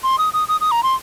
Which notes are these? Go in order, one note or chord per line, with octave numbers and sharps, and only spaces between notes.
C6
D#6
D#6
D#6
D#6
A#5
C6